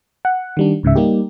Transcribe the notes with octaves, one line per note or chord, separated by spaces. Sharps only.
F#5
D#3 G3 D4
C#2 G#2 C#3 E5
G3 A#3 D#4 G4